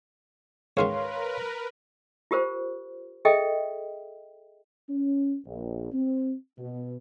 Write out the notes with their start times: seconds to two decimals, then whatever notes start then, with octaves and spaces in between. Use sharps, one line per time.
0.77 C#2 G#2 D#3 A#4 B4 C#5 F5 C6
2.31 F4 G4 A#4 C5
3.25 G#4 A4 D#5 E5 G5
4.89 C#4
5.46 A#1
5.93 C4
6.59 B2